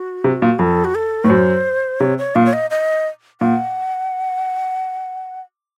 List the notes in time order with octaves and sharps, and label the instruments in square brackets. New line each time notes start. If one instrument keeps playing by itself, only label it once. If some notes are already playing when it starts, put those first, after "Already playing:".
Already playing: [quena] F#4
[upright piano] C3
A#2
[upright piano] F2 [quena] A4
[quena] F#4
A4
[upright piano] A2
[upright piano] F#2 [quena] C5
[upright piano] C3 [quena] C#5
[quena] C#5
[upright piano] A#2 [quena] F5
[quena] C#5
D#5
D#5
[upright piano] A#2 [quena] F#5